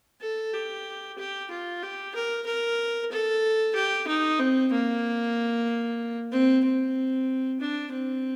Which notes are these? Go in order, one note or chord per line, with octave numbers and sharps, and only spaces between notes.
A4
G4
G4
F4
G4
A#4
A#4
A4
G4
D#4
C4
A#3
C4
C4
D4
C4